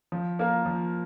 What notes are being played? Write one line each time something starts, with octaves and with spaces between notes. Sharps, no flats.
F3
A#3 F4 A#4
F3